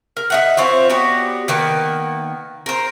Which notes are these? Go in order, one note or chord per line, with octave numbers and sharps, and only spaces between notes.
A#4
D#4 E5 F#5
C4 F4 C5 C#5
B3 D4 F#4 G4
D#3 A#3 B3
A#4 C5